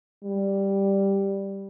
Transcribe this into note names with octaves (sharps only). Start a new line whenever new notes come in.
G3